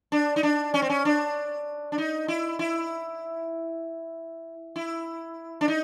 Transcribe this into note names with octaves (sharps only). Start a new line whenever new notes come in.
D4
D#4
D4
C#4
C4
C#4
D4
D4
D#4
E4
E4
E4
D4
D#4